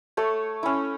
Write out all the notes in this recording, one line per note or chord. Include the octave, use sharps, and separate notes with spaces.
A3 A4 C#5
C#4 E4